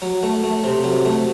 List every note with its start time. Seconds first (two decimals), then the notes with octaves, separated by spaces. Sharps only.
0.02 F#3
0.23 A3
0.44 A3
0.64 C3
0.84 F#3
1.05 A3